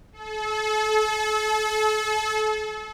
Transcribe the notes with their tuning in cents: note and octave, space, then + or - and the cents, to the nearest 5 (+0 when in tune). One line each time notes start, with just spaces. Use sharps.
A4 -35